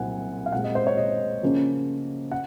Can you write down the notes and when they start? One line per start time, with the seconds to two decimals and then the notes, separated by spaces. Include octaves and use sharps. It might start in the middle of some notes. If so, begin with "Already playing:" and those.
Already playing: C2 A#2 F#3 C4 F#5 G#5
0.46 F5
0.52 A#2 G#3 C4 F#5
0.64 D#5
0.75 C5
0.87 C#5
0.97 D#5
1.43 C#3 F3 A#3 C#4
2.32 F#5